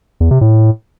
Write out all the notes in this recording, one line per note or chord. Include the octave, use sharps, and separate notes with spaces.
E2
C3
A2